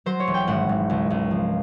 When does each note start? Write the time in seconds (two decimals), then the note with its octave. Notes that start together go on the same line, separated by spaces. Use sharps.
0.06 F#3 C5
0.20 C#5
0.27 E1
0.34 G5
0.47 G#1 F#5
0.69 G#1
0.90 C#2
1.10 C#2
1.31 F3